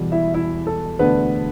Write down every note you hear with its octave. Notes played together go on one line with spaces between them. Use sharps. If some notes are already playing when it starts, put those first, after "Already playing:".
Already playing: E1 E2 B2 G3
E4 E5
E4 E5
A4
E1 D2 D3 A3 B3 D4 B4